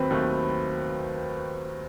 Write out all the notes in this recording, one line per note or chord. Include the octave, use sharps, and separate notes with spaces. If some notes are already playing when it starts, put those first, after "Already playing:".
Already playing: D#2 D#3 F#3 A3 C4 B4
D#2 D#3 F#3 A3